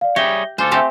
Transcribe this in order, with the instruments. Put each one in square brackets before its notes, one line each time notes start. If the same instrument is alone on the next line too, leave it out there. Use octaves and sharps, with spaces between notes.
[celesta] D5 F5
[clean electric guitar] G3 G#4 C#5 [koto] G4 [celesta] E5 A#6 G7
[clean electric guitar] D2 F4 A4 [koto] C5 [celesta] G#5 D6
[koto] A3 C4 G4 [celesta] E5 G#5 C6